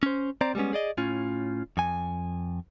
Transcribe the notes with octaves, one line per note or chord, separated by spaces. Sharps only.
C#4 C5
C4 C5 D5 A#5
G3 G#3 B3 C#4
G#4 D5 D#5
A2 C#4 F4
F2 G#5